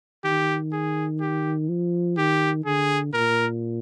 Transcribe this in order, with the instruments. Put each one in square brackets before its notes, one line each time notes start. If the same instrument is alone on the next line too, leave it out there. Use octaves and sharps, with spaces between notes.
[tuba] D#3 [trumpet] G4
[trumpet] G#4
G4
[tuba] F3
[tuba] D#3 [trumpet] G4
[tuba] D3 [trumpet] G#4
[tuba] A#2 [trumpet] A#4